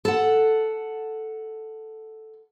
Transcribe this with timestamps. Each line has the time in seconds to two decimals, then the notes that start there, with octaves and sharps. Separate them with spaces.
0.05 A4 F#5